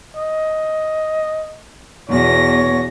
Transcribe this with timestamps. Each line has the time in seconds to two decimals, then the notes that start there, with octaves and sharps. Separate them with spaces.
0.17 D#5
2.10 E2 B2 C#5 A#6